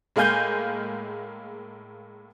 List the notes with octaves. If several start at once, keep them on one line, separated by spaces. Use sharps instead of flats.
A2 G#3 A#3 F5 G#5 G6